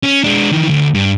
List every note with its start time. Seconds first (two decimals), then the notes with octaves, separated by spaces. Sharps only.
0.03 C#4
0.24 G#3 D4
0.52 D#3 E3
0.69 D2
0.94 G2